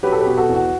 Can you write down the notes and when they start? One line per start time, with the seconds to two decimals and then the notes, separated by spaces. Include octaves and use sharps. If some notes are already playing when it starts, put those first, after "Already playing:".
0.03 F#3 G4 B4
0.12 A4
0.20 G4 B4
0.26 B2
0.37 F#4 A4
0.49 E2
0.55 F#4